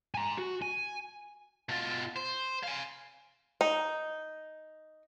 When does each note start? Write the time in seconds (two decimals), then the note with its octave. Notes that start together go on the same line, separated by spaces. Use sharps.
0.15 G#5 A#5
0.38 F#4
0.62 G#5
1.69 B2 F4
2.16 C5
2.63 F5 G#5
3.61 D#4